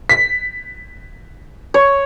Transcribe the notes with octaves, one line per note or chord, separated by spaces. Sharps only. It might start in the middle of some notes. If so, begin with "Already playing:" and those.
B6
C#5